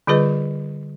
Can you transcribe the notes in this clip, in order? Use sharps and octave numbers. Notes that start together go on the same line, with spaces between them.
D3 G3 F4 G#4 B4 D#5